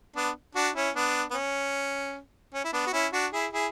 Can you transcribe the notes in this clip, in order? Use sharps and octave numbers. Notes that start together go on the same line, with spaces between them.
B3 D4
D4 F#4
C#4 E4
B3 D4
B3
C#4
C#4
E4
B3 D4
F#4
C#4 E4
D4 F#4
E4 G#4
E4 G#4